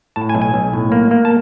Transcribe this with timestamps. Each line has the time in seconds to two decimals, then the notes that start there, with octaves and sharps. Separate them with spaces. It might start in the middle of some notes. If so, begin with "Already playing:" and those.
0.16 A2 A5
0.29 G#5
0.35 B1
0.42 G#5
0.54 B1
0.74 A2
0.92 A#3
1.11 A#3
1.25 A5